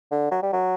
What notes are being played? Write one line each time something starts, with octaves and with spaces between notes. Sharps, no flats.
D3
F#3
G3
F#3